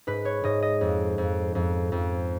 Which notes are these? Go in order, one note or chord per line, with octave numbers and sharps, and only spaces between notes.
G#2 B4
C#5
G#2 D#5
D#5
F2
F2
F2
F2